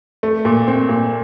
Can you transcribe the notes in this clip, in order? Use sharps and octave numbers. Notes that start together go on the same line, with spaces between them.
A3
A#2
C4
A#2